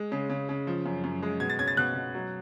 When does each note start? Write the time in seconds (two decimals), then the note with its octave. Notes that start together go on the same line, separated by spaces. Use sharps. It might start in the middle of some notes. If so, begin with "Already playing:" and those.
Already playing: G#3
0.12 C#3
0.30 C#3
0.49 C#3
0.67 F3
0.86 F#2
1.04 F#2
1.23 G#3
1.40 B2 G#6
1.50 A6
1.59 C#4 G#6
1.68 A6
1.77 B2 F#6
1.95 B2
2.15 F#3